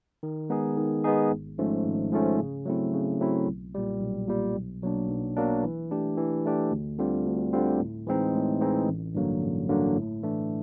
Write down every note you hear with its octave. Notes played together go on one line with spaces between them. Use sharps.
D#3
G#3 B3 D#4 G#4
D#3
G#3 B3 D#4 G#4
G#1
G#2 F3 A3 C#4
G#1
G#2 F3 A3 C#4
C#3
F#3 A3 C4 E4
C#3
F#3 A3 C4 E4
B1
A#2 G3
B1
A#2 G3
B1
B2 F#3 A#3 D4
B1
B2 F#3 A#3 D4
E3
A3 D4 G4
E3
A3 D4 G4
D2
D3 G3 C4 F4
D2
D3 G3 C4 F4
A2
E3 G#3 C4 D#4
A2
E3 G#3 C4 D#4
A1
G2 D3 F#3 A#3
A1
G2 D3 F#3 A#3
A2
E3 A3 D4